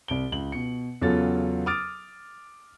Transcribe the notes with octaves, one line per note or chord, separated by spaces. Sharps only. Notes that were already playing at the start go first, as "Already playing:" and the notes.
C2 D7 G7
C#2 F#7
B2 C#7
E2 C#3 F#3 F4 A4 A6
D6 D#6 F6 A6 D7